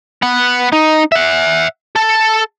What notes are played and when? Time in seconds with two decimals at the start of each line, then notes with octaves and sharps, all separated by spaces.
0.22 B3 F#5
0.72 D#4
1.12 E5 F#5
1.96 A4